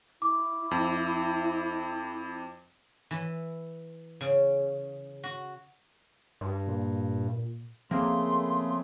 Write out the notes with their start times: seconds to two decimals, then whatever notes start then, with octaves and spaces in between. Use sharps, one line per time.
0.22 E4 D6
0.71 F2
3.11 E3
4.21 C#3
5.24 F#4
6.41 G2
6.67 A#2
7.91 C#3 F3 A3 A#3 C4 G#4 C6